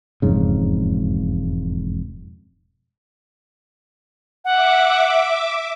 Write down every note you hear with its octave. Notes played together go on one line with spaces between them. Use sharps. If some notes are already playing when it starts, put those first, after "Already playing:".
E1 F2 G#2 C#3
E5 F#5 D6